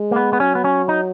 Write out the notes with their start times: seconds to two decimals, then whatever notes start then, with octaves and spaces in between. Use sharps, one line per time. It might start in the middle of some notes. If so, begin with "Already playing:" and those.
Already playing: G#3
0.11 A#3
0.16 B3
0.33 B3
0.40 F#3 C#4
0.55 B3
0.64 C#4
0.89 D#4